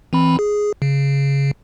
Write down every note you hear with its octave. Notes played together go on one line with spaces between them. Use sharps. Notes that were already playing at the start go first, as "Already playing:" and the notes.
E3 C4 B5
G#4
C#3